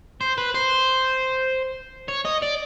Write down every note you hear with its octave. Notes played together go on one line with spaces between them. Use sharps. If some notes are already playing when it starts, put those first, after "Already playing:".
C5
B4
C5
C#5
D#5
D5